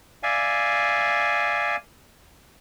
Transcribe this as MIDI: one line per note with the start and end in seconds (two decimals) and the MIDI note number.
0.23 1.76 74
0.23 1.76 76
0.23 1.76 77
0.23 1.76 80